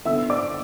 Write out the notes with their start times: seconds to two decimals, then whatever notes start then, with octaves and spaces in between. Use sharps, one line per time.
0.05 D3 B3 E5 E6
0.30 D5 D6